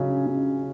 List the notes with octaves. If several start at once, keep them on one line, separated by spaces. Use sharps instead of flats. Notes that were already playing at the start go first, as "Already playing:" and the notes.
Already playing: C#3 F#3 C#4
C#3